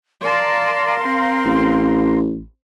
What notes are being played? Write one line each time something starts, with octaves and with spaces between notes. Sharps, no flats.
A#4 D5 F5 A5 C6
C4
A1